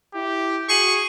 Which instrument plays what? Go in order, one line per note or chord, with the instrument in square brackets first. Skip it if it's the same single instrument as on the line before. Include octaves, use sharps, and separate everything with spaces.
[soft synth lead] E4 [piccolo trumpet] G4
[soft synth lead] F#4 [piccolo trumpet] G#4 [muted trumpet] C#6 [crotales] C7 D#7 F#7